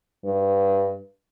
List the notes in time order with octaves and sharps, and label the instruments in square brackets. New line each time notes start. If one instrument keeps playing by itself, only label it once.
[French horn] G2